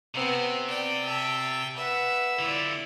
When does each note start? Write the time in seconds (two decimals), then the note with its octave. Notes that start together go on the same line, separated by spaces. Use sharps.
0.15 C3 B3 C4
0.69 D5 G5
1.06 E5 A5
1.76 B4 E5 F#5
2.39 D3 E4 F4 D5